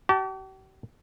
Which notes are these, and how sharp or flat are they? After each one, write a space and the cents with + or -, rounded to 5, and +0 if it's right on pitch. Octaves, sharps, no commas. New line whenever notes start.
G4 -45 A5 +0